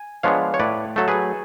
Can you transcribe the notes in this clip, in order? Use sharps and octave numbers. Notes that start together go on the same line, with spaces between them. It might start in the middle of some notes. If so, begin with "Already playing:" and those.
Already playing: G#5
F3 G#3 B3 D4 C#5 F5
C#5
A2 B4 D5
F#3 A3 A4
G#4 B4